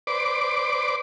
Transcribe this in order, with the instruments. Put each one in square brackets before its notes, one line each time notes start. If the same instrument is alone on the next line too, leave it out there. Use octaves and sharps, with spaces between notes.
[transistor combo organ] B4 C5 D5 D6